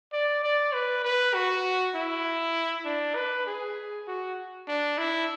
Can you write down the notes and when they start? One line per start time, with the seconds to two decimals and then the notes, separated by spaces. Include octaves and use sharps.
0.12 D5
0.44 D5
0.73 B4
1.05 B4
1.34 F#4
1.95 E4
2.85 D4
3.15 B4
3.47 G#4
4.07 F#4
4.68 D4
4.98 E4